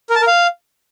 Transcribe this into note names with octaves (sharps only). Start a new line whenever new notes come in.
A#4
A5
A#4
F5